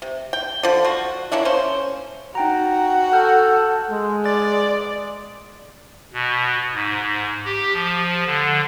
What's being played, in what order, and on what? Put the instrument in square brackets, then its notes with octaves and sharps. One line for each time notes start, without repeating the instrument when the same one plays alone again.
[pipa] C3
G5
D3 F3
F4 F#4
A#3 C#4 D4 E4
C#4 C5
[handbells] D#4 G5 A#5 [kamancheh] F#4
[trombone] A4 [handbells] F6 G6
[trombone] G#3
[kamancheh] D5 [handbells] A6
[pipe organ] B2
G#2
G4
F3
D3